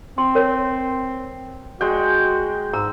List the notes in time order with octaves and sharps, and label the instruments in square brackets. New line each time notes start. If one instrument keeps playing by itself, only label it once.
[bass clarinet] C4 [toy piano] C6
[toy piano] A#4 C#5
[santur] G#3 G5 [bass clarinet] F#4
[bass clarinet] G#2 [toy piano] A#5 [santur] E6